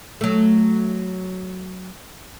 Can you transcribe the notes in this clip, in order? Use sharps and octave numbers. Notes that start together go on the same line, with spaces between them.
F#3 A3